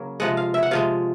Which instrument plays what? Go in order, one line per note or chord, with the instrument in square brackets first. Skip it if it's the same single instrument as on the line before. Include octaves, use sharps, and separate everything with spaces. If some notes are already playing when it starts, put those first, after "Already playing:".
Already playing: [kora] C#3 F#3 A#3
C3 F3 G#3 F#5
F5
E5
F#5
C3 F3 G#3 F5